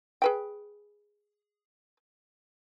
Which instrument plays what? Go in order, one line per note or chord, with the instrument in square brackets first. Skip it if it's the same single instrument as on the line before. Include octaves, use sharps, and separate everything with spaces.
[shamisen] G#4 B4 G5